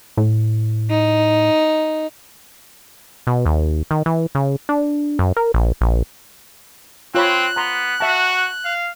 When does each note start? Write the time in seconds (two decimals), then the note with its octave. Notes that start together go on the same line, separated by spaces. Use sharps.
0.17 A2
0.90 D#4
3.27 B2
3.46 D#2
3.91 D#3
4.06 E3
4.35 C#3
4.69 D4
5.19 F#2
5.37 A#4
5.54 A#1
5.81 A#1
7.15 C4 F4 C#5 B5 F#6
7.56 B3 A#5 C6
8.00 F#4 E5 A5
8.65 F5